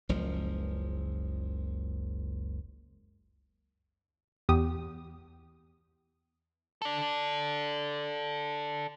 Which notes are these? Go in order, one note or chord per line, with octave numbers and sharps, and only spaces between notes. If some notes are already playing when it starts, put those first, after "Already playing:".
F#1 C#2 F3
E2 G4 D#6
A4 D5